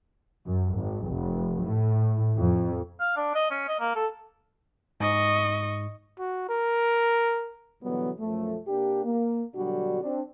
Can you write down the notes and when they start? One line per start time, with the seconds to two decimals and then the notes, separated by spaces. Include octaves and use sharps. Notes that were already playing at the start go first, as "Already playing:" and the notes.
0.46 F#2
0.75 G#1
1.05 F1
1.63 A2
2.37 F2
3.00 F5
3.16 D4
3.35 D#5
3.51 C#4
3.68 D#5
3.80 A#3
3.96 A4
5.00 G#2 D#5 C#6
6.19 F#4
6.49 A#4
7.82 B2 D3 E3 F#3 G3 B3
8.19 B1 F#2 F3 A3
8.67 C3 A#3 D4 G4
9.04 A#3
9.55 B2 D3 F#3 G3 D4 F#4
10.01 C4 D4